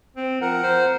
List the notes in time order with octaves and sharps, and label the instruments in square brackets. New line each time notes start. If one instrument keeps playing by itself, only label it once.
[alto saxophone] C4
[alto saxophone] F3 [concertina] A#4 F#5
[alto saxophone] C5